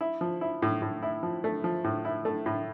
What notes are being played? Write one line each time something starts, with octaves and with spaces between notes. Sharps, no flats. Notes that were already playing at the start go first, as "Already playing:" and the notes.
E4
F3
E4
A2
A2
E4
F3
A3
F3
A2
E4
A3
A2